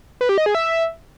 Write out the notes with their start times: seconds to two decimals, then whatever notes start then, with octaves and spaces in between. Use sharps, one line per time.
0.21 B4
0.29 G4
0.38 D#5
0.46 G#4
0.55 E5